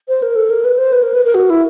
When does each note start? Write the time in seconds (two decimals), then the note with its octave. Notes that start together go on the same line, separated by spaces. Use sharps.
0.08 C5
0.22 A#4
0.36 A4
0.50 A#4
0.65 B4
0.78 C5
0.92 B4
1.03 A#4
1.14 B4
1.25 A#4
1.35 F#4
1.50 E4